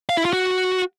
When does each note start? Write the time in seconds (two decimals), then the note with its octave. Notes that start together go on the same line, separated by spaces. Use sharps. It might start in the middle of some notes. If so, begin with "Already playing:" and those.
0.09 F5
0.17 E4
0.25 F4
0.33 F#4